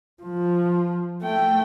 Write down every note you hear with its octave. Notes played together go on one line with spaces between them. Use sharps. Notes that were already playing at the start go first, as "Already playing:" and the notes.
F3
A3 G5